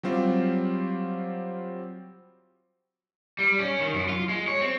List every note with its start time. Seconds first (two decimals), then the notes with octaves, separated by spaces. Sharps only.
0.03 F#3 G3 C4 F4 G4
3.39 G3
3.59 C#4
3.80 D#3
3.94 F#2
4.09 F4
4.29 G#3
4.47 C#5
4.61 C4